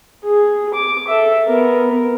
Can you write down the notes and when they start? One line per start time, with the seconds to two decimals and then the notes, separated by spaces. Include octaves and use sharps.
0.24 G#4
0.74 D6
1.08 A4 E5
1.47 B3 A#4